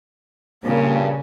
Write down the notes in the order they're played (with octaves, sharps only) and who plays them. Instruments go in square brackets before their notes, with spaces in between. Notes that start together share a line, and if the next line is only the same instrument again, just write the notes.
[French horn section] G2 A#2 [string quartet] C#3 [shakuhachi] A#3